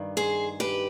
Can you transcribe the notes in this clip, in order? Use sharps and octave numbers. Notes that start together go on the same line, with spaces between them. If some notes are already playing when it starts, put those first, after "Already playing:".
Already playing: G2 D#3
G#4 C5
G4 B4